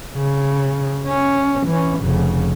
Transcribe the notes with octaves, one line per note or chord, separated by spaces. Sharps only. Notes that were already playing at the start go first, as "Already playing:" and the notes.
C#3
C#4
E3 C#4
F1 C#3